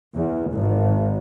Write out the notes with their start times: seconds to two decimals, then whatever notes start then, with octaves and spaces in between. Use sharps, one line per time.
0.15 E2
0.51 G#1